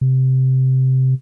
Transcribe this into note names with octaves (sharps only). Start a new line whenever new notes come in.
C3